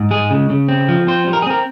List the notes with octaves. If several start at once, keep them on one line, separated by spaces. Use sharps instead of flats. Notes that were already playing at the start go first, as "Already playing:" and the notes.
Already playing: G#2
G#3 G#4
C#3
C#3
C4
F3
C4 C5
G3
A#4
G#4
C4 A#4